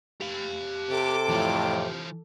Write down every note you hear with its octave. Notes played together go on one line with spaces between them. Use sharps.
G4 F5
C3 A4 D6
F2 A2 E3 F4